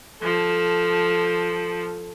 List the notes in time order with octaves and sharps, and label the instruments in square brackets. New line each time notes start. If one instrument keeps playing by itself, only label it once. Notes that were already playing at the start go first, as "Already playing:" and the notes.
[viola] F3 A4